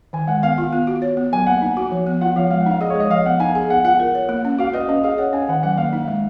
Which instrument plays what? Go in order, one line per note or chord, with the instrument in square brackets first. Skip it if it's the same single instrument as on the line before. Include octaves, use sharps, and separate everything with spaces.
[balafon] D#3 [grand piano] G#5
[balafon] G#3 [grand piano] F#5
[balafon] B3 [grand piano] F5
[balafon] F4
B3
F#4
C#5
B3
[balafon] F#3 [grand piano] G#5
[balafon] A#3 [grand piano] F#5
[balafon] D#4
F#4
F3
B3
[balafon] F4 [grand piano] F#5
[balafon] F3 [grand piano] F5
[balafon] G#3 [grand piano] F5
[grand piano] F#5
[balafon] D#4 [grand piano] F5
[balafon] G#4 [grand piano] D#5
[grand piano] C#5
[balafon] G#3 [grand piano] D#5
[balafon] F3 [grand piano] F5
[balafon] B3 [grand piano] F#5
[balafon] D#4 [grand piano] G#5
[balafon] G#4
[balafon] B3 [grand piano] F#5
[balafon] F4 [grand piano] F#5
[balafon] A#4
C#5
A#3
C#4
[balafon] F#4 [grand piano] F5
[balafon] B4 [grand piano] D#5
[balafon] C#4 [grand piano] D#5
[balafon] G#4 [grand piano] F5
[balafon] C#5 [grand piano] F#5
[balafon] C#4 [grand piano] G#5
[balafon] D#3 [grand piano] F#5
[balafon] F#3 [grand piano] F#5
[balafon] A#3 [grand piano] F5
[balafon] D#4
G#3